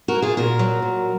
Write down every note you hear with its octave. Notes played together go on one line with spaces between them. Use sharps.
F#4 A#4
A#3
F4 G#4
A#2 F#4 A#4
F#3
A#2